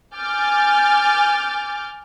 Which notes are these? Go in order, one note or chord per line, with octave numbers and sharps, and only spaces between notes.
G#5 D6 F6 G6 A6